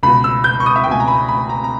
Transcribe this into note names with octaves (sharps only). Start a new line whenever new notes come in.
C#2 B2 B5
E6
G6
C#6
D#6
E5
G5
C#2 B2 G#5
A#5
B5
B5
A#5
A#5